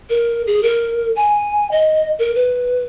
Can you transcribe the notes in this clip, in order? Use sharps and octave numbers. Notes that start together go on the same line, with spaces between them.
A#4
G#4
A#4
G#5
D#5
A#4
B4